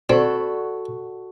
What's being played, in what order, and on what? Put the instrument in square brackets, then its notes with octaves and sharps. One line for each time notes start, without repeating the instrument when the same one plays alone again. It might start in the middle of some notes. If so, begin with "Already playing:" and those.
[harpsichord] C4 [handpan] F#4 [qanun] A4 B5 [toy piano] D5 C#6